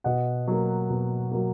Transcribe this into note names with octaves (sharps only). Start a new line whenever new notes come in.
B2 D#5 F#5
F#3 A#3
B2
F#3 A#3